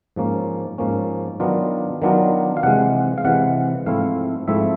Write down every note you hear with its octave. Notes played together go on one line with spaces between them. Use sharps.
G#2 F3 A#3 C#4
G#2 F3 A#3 C#4
D#3 F#3 B3 D4 F4
D#3 F#3 B3 D4 F4
F5
C3 E3 G#3 F#5
F5
C3 E3 G#3 F#5
G#2 F3 A3 C4 E4 F5
G#2 F3 A3 C4 E4 E5